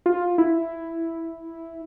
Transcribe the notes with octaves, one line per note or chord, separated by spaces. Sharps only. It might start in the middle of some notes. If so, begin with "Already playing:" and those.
F4
E4